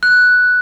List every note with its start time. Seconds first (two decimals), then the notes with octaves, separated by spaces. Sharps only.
0.03 F#6